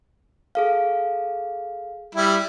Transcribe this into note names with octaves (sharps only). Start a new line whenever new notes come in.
G#4 A4 F5
G3 E4